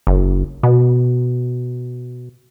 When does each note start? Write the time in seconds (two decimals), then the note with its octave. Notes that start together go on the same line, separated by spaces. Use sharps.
0.07 F#1
0.63 B2